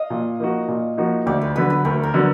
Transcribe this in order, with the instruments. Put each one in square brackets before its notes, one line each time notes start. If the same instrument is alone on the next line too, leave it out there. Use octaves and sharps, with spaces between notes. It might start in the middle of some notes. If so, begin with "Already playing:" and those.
Already playing: [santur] D#5 F5
[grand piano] A#2
F3 A#3 D#4 F#4
A#2
F3 A#3 D#4 F#4
[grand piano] D2 [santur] D5
[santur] B4
[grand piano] D3 F#3 B3 [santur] B4
[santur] B4
[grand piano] D2 [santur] A#4
[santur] A#4
[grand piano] D3 F#3 B3